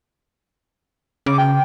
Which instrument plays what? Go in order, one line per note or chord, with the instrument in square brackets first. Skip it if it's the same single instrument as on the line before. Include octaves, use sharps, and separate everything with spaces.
[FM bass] C#3 [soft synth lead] D6
[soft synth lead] G5